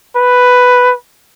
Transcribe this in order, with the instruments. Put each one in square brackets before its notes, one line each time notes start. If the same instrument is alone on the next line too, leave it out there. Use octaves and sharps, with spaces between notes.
[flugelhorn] B4